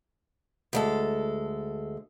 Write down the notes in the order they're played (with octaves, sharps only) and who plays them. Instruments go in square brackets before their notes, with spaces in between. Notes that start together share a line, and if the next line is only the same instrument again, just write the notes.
[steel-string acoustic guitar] D2 G#3 A4